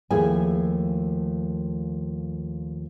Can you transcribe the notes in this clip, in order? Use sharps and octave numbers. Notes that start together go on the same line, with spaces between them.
D#2 F3 A3 E4 G#4 G#5